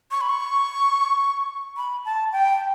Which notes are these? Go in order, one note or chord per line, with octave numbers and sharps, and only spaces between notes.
C#6
B5
C#6
B5
A5
G5